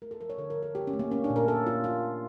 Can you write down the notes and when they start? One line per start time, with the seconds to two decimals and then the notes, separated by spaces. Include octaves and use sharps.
0.02 A3 A#4
0.11 A4
0.20 F3 A#4
0.30 C#5
0.38 D3 A4
0.50 A#4
0.57 F3
0.63 A4
0.75 A3 G4
0.87 C#4
0.93 A3
0.99 A#3
1.11 A3 C#4
1.24 D4
1.30 A#2
1.36 A#4
1.48 A#2 A4
1.66 A#3 F4
1.84 A#2 F4
2.03 A#3